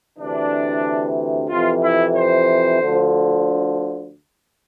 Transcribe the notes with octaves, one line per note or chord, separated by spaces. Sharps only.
D2 C3 E3 D4
F2 C3 E3 F4
E4
C5
D2 D3 F3